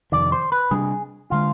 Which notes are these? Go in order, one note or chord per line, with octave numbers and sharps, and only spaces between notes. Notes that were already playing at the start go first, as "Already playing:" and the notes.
F2 C3 D#3 D5
C5
B4
C3 G3 D4 G#4
D3 G#3 F4